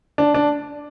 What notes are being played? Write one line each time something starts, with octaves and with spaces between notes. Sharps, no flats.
D4
D4